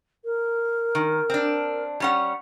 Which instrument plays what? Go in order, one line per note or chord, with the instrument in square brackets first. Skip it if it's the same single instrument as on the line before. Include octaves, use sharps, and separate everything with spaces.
[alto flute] A#4
[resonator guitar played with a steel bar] D#3
C4 D4
G3 C#4 F#5